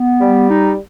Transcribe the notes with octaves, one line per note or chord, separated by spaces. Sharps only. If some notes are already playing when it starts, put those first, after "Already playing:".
Already playing: B3
G3
D#4